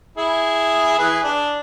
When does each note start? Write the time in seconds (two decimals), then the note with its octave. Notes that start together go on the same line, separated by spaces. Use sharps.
0.18 E4 G#4
0.99 E3 G#4 B4
1.24 D4